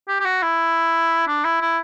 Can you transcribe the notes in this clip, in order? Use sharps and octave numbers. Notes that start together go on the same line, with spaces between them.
G4
G4
F#4
E4
D4
E4
E4